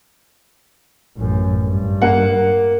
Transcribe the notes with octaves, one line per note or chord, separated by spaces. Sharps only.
A1 F#2
G2
A#3 F#5